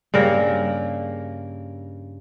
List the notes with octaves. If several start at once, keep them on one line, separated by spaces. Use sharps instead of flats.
G2 C#3 A#3 A#4